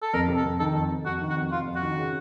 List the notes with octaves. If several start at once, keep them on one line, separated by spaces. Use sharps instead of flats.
A4
F2 A#4
C3
A4
F2
D#3 A4
F2 A4
C3
F2 F#4
D#3
F#4
F2
C3 F4
F2
F#4
D#3
C#3